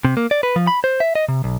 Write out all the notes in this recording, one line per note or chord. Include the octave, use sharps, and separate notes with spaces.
C3
A#3
D5
B4
F3
B5
C5
E5
D#5
C3
B1